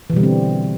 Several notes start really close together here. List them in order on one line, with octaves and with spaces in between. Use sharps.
E3 B2 G3 D3 C4